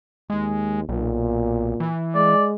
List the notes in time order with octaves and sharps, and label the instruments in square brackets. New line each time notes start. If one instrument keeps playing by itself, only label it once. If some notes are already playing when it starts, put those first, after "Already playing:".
[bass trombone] D#2 [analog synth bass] G#3
[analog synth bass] B1 [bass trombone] A#2
[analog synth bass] E3
[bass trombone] G#3 [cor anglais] D5